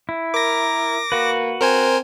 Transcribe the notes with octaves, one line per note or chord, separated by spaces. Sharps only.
E4
A#4 D6 A#6
A#3 F#4 B4
C4 A#4 C5 G#5